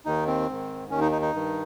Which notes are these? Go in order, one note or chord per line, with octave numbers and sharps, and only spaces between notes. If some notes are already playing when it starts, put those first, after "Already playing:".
D#2 D#3 D#4
C4
G#2 D#3
D#2 D#3 C#4
D#4
D#4
D#4
G2 D#3